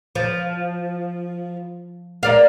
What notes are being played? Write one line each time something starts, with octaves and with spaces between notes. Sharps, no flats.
F3
A#3 D5 F5